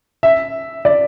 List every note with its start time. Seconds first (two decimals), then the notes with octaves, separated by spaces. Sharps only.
0.23 E5
0.85 D5